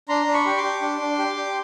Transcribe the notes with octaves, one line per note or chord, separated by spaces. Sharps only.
D4 A#5 C6
D4
B5 C#6
G4
C6 D6
G4
D4
D4
G4
G4